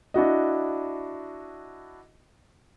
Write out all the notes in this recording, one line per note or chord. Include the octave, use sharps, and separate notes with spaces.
D4 E4 F#4 D#5